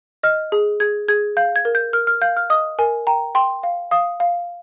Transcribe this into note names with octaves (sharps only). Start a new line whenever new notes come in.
D#5 F6
G#4
G#4 G#6
G#4 G#6
F5 G6
G#6
A#4
G6
A#4 F6
F6
F5 G6
F6
D#5 D#6
A#4 G#5
G5 A#5
G5 C6
F5
F5 D#6
F5